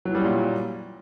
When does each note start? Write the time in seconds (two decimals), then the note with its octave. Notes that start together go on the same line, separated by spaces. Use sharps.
0.05 F#3
0.10 E3
0.15 G3
0.20 C#4
0.24 A#2